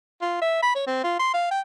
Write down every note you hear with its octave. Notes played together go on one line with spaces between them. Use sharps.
F4
E5
B5
C#5
C4
F4
C6
F5
G5